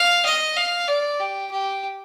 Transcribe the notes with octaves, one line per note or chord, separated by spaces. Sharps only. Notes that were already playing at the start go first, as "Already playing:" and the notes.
Already playing: F5
D#5
F5
D5
G4
G4